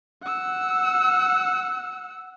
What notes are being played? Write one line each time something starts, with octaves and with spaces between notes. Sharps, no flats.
F#5 E6